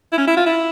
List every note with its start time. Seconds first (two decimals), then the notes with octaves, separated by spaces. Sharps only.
0.12 E4
0.18 C#4
0.27 E4
0.37 F4
0.46 E4